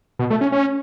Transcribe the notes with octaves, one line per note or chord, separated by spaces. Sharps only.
B2
A3
C#4
C#4